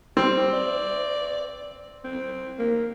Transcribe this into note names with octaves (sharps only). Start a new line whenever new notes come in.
G3 C4
D5
C4
A#3